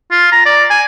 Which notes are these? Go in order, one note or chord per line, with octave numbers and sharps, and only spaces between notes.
F4
A#5
D5
G#5